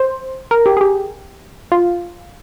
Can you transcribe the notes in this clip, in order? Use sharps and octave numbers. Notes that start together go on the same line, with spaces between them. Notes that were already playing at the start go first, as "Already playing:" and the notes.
Already playing: C5
A#4
G4
G#4
G4
F4